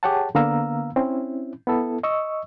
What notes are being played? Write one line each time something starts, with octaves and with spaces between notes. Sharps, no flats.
G4 G#4 C#5 F#5 G5 A5
D3 A#3 B3 F5 A#5 E6
C4 C#4 E4
B3 E4 A4
D#5 C#6 E6